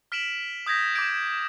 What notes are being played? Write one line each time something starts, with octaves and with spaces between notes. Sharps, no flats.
F6 B6 D7 E7 F#7
D#6 G6 G#6 A#6 B6
D6 G6 G#6 D7